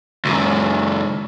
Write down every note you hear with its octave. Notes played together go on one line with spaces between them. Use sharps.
C#2 F#2